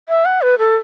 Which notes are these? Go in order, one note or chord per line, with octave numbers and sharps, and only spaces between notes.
E5
F#5
B4
A4